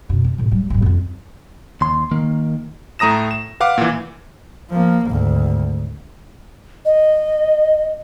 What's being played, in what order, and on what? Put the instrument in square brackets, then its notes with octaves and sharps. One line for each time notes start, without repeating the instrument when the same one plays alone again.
[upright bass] F#2 B2
D4
D2 A2
F#3 G3
A1 G2
F2 F4
[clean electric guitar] D#2 C6
D#3 A#3
[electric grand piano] A2 A3 A#5 D#6 A#6 E7
E7
B4 F5 F#5 D6
A#2 E3
[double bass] F3 A#3
G#1 D2
[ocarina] D#5